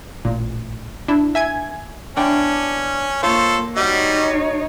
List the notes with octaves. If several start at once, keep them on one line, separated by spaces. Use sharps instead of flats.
A1 A#2
D4 E4
E5 G#5 G#6
E2 C#4 D4 G5
A#3 F4 A4 C5 C#5
G3 D#4 F#4 C#5 D#5